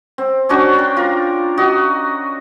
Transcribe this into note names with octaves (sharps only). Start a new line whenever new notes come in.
C4
C#4 D4 F#4 C5
A#4 G5
F4 A#4
F#4 D#5